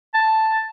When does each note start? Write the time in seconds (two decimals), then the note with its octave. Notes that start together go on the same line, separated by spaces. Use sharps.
0.15 A5